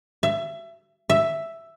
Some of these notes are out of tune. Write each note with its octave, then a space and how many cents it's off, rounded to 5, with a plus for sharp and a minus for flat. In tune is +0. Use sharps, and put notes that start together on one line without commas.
E5 +25
E5 +5